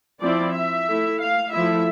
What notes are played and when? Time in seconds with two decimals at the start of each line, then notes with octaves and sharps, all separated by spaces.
0.21 F3 C4 E4 D5
0.54 E5
0.87 A3 E4
1.20 F5
1.52 F3 A3 E4 E5